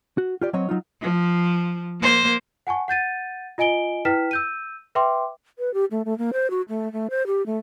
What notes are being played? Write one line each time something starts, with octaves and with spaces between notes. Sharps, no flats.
F#4
F4 G4 D5
F#3 C4 C#5 D#5
F#3 D#4 F4
F3
A#3 C5
F#5 G#5 A5 C#6
F#5 G6 A6 D#7
F4 D#5 G#5 D7 G7
E4 B4 G5 F6 B6 E7
E6 G6 D#7
B4 E5 G5 C6 D6
B4
G4
A3
A3
A#3
C5
F#4
A3
A3
C5
G4
A3